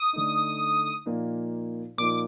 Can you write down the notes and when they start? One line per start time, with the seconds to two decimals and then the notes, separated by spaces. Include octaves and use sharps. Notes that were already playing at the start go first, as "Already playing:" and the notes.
Already playing: D#6
0.13 D3 A3 D#4
1.06 A#2 F3 A#3 D#4
1.98 A#2 F3 A#3 D#4 D6